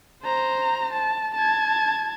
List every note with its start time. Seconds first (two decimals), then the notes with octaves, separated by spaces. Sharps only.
0.23 C5 A#5
0.93 A5
1.35 A5 G#6